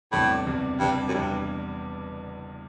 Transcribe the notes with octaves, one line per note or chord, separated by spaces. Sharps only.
F#1 E2 A2 C3 G3 D4
F#1 E2 C3 G3 D4
F#1 E2 G2 C3 G3 D4
F#2
F#1 E2 G2 C3 G3 D4